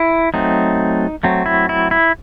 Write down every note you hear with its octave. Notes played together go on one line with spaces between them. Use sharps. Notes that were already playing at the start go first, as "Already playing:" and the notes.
Already playing: E4
F#3 A3 C4 D#4
F#3 A3 C4
E4
E4
E4